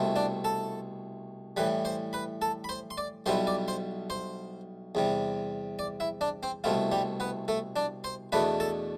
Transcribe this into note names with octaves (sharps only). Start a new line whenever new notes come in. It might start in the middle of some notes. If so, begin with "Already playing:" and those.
Already playing: C2 B2 A3 C4 E4
D4 D5
A4 A5
A2 E3 G3 B4 B5
C5 C6
B4 B5
A4 A5
B5
C5 C6
C6
D5 D6
B1 B2 G3 B3 E4 C5 C6
D5 D6
C5 C6
C5 C6
E2 C3 G3
D5 D6
E4 E5
D4 D5
C4 C5
C2 B2 A3 C4 E4 F4
G3 G4
B3 B4
A3 A4
D4 D5
C5 C6
E2 B2 A3 D4 B4 B5
A4 A5